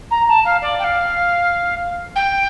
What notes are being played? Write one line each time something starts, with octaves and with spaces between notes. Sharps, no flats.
A#5
A5
F5
D5
G5
F5
G5